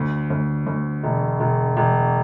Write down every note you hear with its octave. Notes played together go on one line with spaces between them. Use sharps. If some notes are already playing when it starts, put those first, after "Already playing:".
Already playing: D2
D2
D2
E1
E1
E1